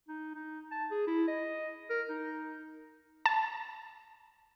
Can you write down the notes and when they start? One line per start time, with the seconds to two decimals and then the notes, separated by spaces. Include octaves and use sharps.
0.08 D#4
0.35 D#4
0.71 A5
0.91 G#4
1.07 E4
1.28 D#5
1.90 A#4
2.09 D#4
3.26 A5